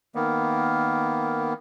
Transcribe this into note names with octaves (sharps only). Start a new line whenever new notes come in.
D#3 A#3 B3